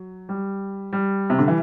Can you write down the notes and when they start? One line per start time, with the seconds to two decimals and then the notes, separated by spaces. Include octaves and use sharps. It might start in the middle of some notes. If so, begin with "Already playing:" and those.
Already playing: F#3
0.29 G3
0.93 G3
1.30 C3
1.39 D3
1.48 E3